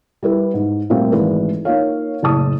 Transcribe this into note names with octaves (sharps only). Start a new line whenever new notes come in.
G3 E4 B4
G#2
A#2 G3 A3 A#3 C4
G#1 E3 G#3 A3 B4
A#3 D#4 F4 C#5 F5
F#1 A2 A5 D#6